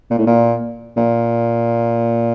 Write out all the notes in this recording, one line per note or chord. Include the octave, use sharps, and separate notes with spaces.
A#2
A2
A#2
A#2